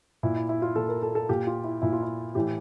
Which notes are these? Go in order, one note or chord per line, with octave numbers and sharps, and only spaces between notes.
A#2 E4
E4
E4
F4
A#2 A4
A#4
A4
A4
A#2 G4
F4
E4
A#2 E4
F4
E4
A2 E3 G4